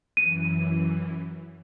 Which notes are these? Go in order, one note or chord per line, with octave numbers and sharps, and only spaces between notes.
F#2 E3 D#7